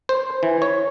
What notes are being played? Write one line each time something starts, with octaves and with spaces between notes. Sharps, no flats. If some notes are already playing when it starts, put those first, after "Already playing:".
C5
E3
C#5